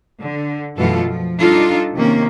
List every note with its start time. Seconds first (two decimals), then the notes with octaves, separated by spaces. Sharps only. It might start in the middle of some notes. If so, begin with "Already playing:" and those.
0.22 D3
0.77 F#2 B2 E3 A3 F4 A4
1.08 F3
1.40 G3 D4 D#4 F4 A4
1.95 C3 D#3 A#3 C#4